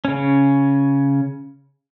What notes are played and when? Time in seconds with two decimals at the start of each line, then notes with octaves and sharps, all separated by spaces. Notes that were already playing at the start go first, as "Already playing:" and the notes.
0.05 C#3 C#4